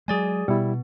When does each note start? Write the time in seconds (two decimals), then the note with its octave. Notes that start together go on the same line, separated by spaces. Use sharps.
0.08 F#3 G#3 G#4 D5 G#5
0.48 B2 G3 B3 E4